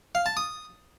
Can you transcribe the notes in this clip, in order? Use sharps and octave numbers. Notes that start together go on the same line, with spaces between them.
F5
A5
D#6